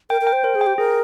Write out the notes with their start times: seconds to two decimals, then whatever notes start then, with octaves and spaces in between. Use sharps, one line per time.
0.10 A#4 G5
0.21 A#4
0.27 G5
0.33 C5
0.44 A#4 C5
0.55 G#4
0.61 G5
0.66 G4
0.78 G#4 A#4